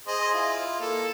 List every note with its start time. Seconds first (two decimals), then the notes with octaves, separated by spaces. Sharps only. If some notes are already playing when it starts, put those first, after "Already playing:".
0.07 G#4 C5 D#5
0.34 E4 F4
0.81 A#3 A4